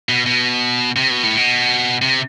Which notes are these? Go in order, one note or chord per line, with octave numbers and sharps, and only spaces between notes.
B2
B2
C3
B2
A2
B2
C3